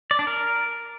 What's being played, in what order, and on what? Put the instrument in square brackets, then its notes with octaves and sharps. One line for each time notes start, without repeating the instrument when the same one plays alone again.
[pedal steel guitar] D5
D4
A#4